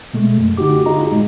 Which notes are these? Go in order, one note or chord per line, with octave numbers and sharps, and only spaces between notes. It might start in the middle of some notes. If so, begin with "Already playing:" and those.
B2 G#3 A3
F#2
D3 D#4 F#4 G4 D6
D#4 F4 G#4 D#5 A#5
A2 G#3